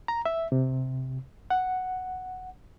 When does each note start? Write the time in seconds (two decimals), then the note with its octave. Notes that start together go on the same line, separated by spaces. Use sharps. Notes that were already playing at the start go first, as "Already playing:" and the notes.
0.08 A#5
0.25 E5
0.52 C3
1.50 F#5